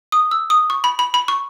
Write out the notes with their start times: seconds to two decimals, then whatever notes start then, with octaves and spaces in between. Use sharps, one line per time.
0.12 D#6
0.31 E6
0.50 D#6
0.70 C#6
0.84 B5
0.99 B5
1.14 B5
1.28 C#6